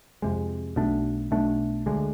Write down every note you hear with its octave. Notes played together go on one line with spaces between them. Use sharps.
F2 C3 G#3
B1 B2 A3 D4
B1 B2 A3 D4
D2 D3 G#3